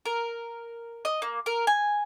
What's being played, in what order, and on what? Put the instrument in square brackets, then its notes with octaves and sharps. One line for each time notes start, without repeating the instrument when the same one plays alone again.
[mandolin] A#4
D#5
A#3
A#4
G#5